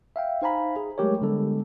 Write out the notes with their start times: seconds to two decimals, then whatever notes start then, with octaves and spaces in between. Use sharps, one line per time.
0.16 E5 F5 G5
0.42 D#4 C5 F5 G#5 A#5 B5
0.76 G#4
0.98 F#3 G#3 A3 G4 A#4 C#5
1.22 D3 G3 G#3 B3 A4